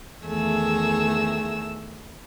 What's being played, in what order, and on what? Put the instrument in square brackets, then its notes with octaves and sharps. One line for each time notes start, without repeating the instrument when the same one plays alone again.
[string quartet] E2 D#3 E3 A3 G#4 E6